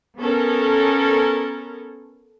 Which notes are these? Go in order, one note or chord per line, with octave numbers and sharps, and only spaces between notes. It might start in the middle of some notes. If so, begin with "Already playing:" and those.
B3 C#4 A4 A#4